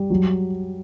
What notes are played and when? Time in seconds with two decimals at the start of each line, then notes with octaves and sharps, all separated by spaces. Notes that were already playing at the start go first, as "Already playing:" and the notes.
Already playing: G3
0.10 F#3